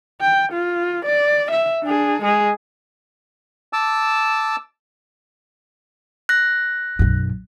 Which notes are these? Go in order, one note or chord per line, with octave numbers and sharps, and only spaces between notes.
G5
F4
D5
E5
D4 G#4
G#3 G#4
A5 D6 E6
F#6 A#6
B1 F#2